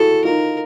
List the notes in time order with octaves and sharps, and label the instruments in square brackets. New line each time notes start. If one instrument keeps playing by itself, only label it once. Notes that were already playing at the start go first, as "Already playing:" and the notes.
Already playing: [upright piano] E4 F#4 G#4 [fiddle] A4
[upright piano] D#4 F4 [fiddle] A#4